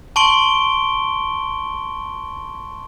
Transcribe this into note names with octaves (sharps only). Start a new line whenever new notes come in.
A5 C6 C#6 D7 G7